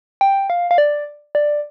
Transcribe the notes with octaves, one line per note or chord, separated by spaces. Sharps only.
G5
F5
F5
D5
D5